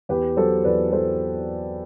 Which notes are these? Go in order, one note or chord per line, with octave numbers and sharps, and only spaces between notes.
E2 G4 B4
F#3 A4 C5
E2 B4 D5
F#3 A4 C5